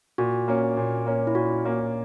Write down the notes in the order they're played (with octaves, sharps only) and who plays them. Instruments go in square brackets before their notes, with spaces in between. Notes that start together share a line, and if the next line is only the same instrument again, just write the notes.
[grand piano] A#2 [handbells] F#4
[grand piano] A#3 C#4
A#2
A#3 C#4
[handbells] E4
[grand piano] A#2 [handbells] F#4
[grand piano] A#3 C#4